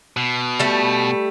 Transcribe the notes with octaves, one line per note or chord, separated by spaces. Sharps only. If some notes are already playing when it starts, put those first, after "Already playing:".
B2
G3 A3